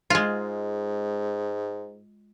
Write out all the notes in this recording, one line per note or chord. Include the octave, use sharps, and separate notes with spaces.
G#2 G#3 F4